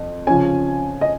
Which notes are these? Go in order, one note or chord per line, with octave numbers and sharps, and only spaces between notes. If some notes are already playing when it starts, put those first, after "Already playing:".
Already playing: F2
C#3 F3 C#4 G#5
D#5